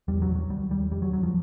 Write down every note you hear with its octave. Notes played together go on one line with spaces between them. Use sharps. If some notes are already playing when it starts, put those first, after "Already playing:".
E2 G3
F#3
E2
F#3
D#2 G3
D#2 G3
F2 G3
F#3
F2 F#3
F3